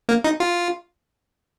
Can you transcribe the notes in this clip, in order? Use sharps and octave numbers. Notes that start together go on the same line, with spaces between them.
A#3
D#4
F4